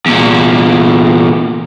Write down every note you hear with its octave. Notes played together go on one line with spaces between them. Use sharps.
E2 A#2